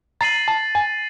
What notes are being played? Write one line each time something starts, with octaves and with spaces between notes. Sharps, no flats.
A#5 A6 C7 D#7 F#7
A5
G#5